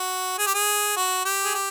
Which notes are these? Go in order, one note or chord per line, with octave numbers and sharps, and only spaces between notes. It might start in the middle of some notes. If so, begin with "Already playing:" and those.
Already playing: F#4
G#4
G4
G#4
F#4
G4
G#4
G4